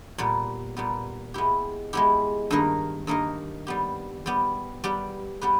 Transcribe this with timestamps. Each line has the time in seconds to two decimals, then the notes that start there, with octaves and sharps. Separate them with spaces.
0.18 A#2 G3 B3
0.77 A#2 G3 B3
1.34 G#3 B3 E4 G4
1.93 G#3 B3 E4 G4
2.50 G2 D#3 A#3 D#4 A#4
3.07 G2 D#3 A#3 D#4 A#4
3.67 G3 B3 G4
4.26 G3 B3 G4
4.84 G3 B3 G4 B4
5.41 G3 B3 G4 B4